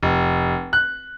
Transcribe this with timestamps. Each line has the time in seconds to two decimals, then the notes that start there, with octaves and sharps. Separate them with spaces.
0.03 F1
0.73 F#6